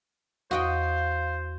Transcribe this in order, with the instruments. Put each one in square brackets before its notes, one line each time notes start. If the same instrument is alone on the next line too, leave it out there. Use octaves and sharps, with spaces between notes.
[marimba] E2 [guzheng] F#4 D#5 G5 [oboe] C5 [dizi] F5